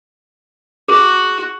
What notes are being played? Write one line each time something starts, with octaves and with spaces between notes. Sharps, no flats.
F#4 G#4